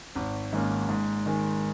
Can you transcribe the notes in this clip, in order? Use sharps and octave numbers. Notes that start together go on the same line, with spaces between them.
G#1
G#2 D#3 A#3 C#4
G#2
D#3 G#3